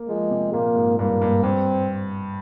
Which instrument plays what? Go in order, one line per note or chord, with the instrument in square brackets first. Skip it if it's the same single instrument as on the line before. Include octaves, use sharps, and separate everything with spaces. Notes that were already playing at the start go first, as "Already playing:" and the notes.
Already playing: [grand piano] A#3
[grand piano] F3 [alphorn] G#3
[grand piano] C3
[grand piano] A#2 [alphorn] A#3
[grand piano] G#2
[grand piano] G2 [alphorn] A#3
[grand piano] G2
[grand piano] G2 [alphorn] C4